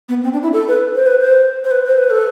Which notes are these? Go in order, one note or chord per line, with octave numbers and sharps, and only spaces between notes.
B3
C4
D4
E4
A4
B4
C5
B4
C5
C5
B4
C5
B4
A4